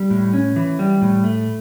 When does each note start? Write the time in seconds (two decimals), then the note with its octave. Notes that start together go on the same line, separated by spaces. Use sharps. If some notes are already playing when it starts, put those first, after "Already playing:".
Already playing: G3
0.10 A2
0.33 C#4
0.56 E3
0.79 G3
1.02 A2
1.24 A3